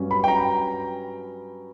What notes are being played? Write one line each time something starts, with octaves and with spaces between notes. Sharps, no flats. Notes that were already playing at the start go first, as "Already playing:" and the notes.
Already playing: G2 F#3 C#4
B5
G5
A#5